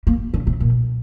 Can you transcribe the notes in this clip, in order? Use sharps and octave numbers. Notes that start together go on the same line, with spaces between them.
A#3
D3
C3
A#2